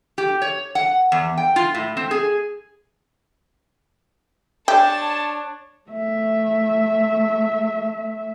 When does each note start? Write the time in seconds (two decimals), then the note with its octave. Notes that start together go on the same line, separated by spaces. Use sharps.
0.18 G4
0.42 C#5
0.75 F#5
1.12 E2
1.37 G5
1.56 F4
1.74 A2
1.97 C4
2.11 G#4
4.68 D4 G4 C#5 A5
5.90 A3 E5